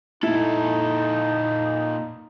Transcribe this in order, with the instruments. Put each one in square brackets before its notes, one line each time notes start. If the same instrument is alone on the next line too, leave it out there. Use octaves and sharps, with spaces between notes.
[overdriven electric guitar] A#2 A4 [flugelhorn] D#4 [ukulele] E4